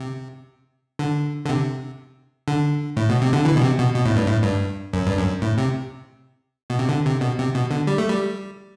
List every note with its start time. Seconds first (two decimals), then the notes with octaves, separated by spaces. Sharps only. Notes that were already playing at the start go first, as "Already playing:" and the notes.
Already playing: C3
0.99 D3
1.46 D3
1.49 C3
2.48 D3
2.97 A2
3.09 B2
3.22 C3
3.33 D3
3.45 E3
3.56 B2
3.62 C3
3.79 B2
3.95 B2
4.06 A2
4.16 G2
4.27 A2
4.43 G2
4.93 F#2
5.07 G2
5.17 F#2
5.42 A2
5.58 C3
6.70 B2
6.79 C3
6.89 D3
7.06 C3
7.21 B2
7.39 C3
7.55 B2
7.71 D3
7.87 G3
7.98 A3
8.09 G3